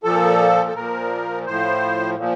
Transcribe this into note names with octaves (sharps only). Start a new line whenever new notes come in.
A#2 F3 A4
A4
A#2 F3 A#4
A2 F3 C5
A#2 F3